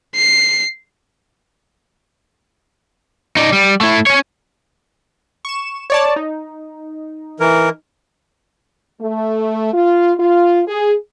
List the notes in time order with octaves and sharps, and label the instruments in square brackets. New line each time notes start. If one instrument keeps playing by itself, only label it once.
[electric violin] C7
[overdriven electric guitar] D#4 D5
G3
A3 E4
C#4 C#5
[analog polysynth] C#6 E7
C#5 D5 A5
D#4
[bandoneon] E3 A#4
[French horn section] A3
F4
F4
G#4